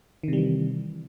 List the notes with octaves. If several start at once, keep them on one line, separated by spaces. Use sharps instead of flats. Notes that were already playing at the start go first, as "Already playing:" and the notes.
C3 D#3 E3 G3